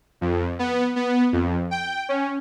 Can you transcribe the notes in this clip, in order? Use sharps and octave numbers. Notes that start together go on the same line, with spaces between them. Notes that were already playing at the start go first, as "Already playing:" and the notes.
F2
B3
B3
F2
G5
C#4